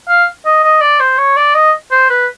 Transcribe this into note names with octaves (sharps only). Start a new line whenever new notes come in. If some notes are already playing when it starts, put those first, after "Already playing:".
F5
D#5
D#5
D5
C5
C#5
D5
D#5
C5
B4